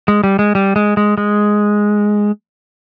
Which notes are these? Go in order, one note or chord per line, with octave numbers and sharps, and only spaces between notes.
G#3
G3
G#3
G3
G#3
G#3
G#3